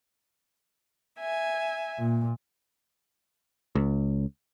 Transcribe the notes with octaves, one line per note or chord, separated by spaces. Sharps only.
E5 G#5
A#2
C#2